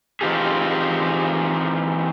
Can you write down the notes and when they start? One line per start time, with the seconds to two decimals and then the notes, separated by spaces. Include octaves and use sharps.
0.21 E3 C4 D#4 F4 G4 G#4